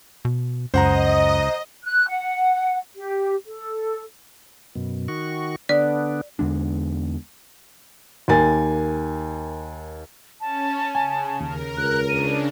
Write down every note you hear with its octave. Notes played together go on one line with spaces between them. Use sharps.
B2
C#2 F#2 C5 D#5 F#5 A#5
F#6
F#5
G4
A4
F#2 B2
D#3 F#4 C#6
D3 B3 D4 D5
E2 D3 G#3 D4
D#2 A#3 G#5 A6
C#4 A5
C#3 G#5
D#2 A#4
C#2 F#6
C#3 D4 D#7